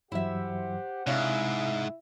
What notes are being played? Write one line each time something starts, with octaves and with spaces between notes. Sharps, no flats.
G2 E3 F#3 E4 G4 C5 E5 F#5
G#2 C3 D4 E4 C#5 E5 F5